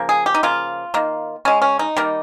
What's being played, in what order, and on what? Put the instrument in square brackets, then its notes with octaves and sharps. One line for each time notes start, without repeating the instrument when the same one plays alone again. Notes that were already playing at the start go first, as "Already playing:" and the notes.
Already playing: [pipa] C#3 F3 A#3
G#4
G4
D#4
C#3 F3 A#3 F4
D#3 A#3
C#3 G#3 C#4
C#4
D#4
D#3 G3 A#3